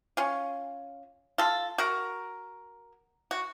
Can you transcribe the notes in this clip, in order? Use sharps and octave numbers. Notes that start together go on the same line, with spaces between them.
C#4 F4
F4 A4
F#4 A#4
F#4